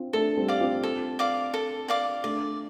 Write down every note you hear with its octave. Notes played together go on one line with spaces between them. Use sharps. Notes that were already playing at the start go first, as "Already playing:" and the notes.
Already playing: C4 D4 F4
A3 D4 A4
G3 C4
D5 F5 D6
C4 F4
A4
D5 F5 D6
A4
D5 F5 D6
A3 D4 D5